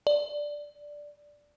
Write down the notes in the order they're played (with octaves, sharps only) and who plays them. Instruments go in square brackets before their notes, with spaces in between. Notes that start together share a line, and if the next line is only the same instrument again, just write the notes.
[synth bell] D5